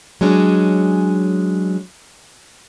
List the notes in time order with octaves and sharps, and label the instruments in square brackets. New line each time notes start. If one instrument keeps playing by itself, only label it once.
[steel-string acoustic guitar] F#3 G#3 C#4 D4